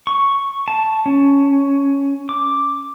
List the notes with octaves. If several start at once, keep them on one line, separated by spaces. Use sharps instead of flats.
C#6
A5
C#4
D6